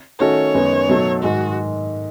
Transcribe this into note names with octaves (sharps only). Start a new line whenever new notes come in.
D#3 A3 C#4 F#4 A4 C#5
F#2 D#3 G#3 B3 D#4
B2 F#3 A3 D#4 A4
G#2 D#3 G#3 F#4